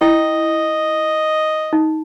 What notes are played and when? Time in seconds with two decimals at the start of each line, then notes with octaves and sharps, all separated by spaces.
0.01 E4 D#5 G5
1.73 D#4